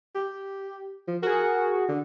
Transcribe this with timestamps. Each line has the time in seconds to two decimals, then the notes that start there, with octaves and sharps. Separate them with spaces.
0.15 G4
1.08 F3
1.23 F#4 G#4 A#4
1.88 D3